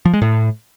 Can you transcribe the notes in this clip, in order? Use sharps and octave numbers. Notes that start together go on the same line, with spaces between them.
F3
G#3
A2